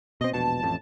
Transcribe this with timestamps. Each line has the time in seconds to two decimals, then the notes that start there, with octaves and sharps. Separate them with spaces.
0.21 B2 C4 D#5
0.33 E1 A#1 B2 A5
0.63 A1 F2 A2